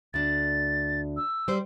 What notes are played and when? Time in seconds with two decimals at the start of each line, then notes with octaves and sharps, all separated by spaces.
0.14 D2 D4 A6
1.17 E6
1.48 G3 C5